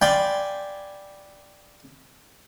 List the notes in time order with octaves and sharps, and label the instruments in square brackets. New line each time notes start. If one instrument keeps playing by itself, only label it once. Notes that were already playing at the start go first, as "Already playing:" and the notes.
[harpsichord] D5 F5 G5 G#5 B5 C6